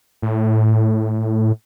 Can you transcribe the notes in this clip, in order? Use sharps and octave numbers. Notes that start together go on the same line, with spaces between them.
A2